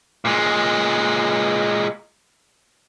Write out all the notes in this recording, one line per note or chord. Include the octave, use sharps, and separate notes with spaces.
A#2 G#3